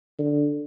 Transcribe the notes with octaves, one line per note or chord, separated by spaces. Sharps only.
D3